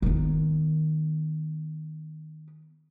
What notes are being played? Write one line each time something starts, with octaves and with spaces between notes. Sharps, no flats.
D#3 B3